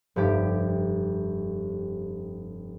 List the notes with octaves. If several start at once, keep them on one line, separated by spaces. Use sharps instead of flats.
F1 G2 G4 D6